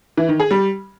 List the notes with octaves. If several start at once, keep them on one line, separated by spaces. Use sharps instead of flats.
E3
D#3
G#4
G3